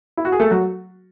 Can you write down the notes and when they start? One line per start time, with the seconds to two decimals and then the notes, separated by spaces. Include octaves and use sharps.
0.17 E4
0.25 F#4
0.32 G#4
0.39 A3 A4
0.51 F#3 F#4